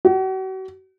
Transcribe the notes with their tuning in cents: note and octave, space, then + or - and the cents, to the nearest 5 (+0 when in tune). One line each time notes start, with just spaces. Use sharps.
F#4 +40